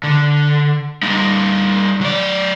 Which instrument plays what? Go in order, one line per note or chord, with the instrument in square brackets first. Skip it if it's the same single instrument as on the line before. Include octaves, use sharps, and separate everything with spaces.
[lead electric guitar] D3
G3 D#4
F#3 D5